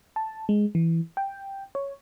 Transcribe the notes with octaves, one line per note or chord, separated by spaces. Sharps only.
A5
G#3
E3
G5
C#5